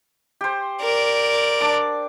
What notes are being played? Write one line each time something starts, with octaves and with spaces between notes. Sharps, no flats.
G4 C5
A#4 D5
D4 D6